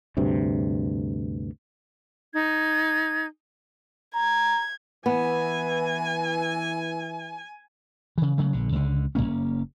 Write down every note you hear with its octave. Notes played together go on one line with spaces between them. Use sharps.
D2 G2 C3
D#4 G#6
A#5 G#6
E3 B3 G#5
C#3 E3
C#3 F#3 A3
A#1 D3
C#2 D3
F#1 F#2 A#3 C#4